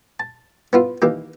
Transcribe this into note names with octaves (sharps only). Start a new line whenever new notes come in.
A5
B3 E4 F4
D#3 E3 A#3 G4